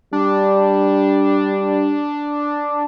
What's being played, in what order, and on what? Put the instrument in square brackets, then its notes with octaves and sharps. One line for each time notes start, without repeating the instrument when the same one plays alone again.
[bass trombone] G3 [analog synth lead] D4